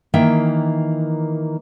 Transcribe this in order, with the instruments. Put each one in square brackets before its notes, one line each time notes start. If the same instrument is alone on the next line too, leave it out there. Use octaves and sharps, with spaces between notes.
[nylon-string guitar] D#3 E3 A#3 E5 G5